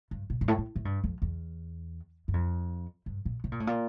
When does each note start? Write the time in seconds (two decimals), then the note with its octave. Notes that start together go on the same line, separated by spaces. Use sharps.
0.11 G2
0.30 A#2
0.41 G2
0.48 A2
0.58 A2
0.76 A2
0.85 G2
1.04 F2
1.22 E2
2.28 G2
2.34 F2
3.06 G2
3.25 A#2
3.44 C3
3.52 A#2
3.60 A2
3.67 A#2